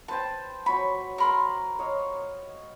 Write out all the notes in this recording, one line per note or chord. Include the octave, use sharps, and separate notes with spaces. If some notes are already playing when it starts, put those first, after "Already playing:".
B4 C5 G5 A5
F#3 B5 C#6
A#4 B5 C6
C#5 D#5 F5